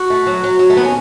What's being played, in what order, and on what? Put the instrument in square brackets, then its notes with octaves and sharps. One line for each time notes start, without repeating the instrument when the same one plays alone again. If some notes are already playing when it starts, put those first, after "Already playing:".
Already playing: [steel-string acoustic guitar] F#4
A3
F#3
F#3
F#3
A3
D#2 B3
C#4